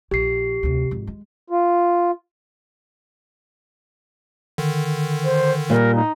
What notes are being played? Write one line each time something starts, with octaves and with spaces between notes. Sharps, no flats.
A#1 G4 C7
D2 C3
G#1 F2
G#3
F4
D3 D#3
C5
A#2 G3 A#4
D#4